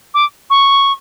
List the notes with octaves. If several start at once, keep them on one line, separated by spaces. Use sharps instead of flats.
D6
C#6